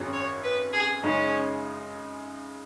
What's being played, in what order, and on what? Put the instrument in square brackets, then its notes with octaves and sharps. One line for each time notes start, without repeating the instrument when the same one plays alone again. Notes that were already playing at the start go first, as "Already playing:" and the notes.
Already playing: [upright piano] G#1 F#2 F#3 C#4 G#4
[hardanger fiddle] C#5
B4
G#4
[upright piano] F#2 C#3 G#3 D#4 G#4 [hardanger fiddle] C#4